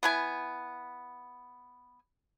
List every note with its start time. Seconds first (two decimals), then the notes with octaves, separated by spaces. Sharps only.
0.03 B3 E4 G#5